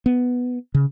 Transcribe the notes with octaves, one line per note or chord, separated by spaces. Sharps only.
B3
C#3